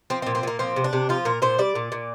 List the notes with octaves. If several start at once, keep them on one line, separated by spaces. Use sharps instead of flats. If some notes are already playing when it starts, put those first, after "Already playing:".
F3 C4
C4
A#2
C4
A#2 A#3
F3 C4
C3
D4
C3
F3 F4
A#2 A#4
A#2 C5
G3 D5
A#2
A#2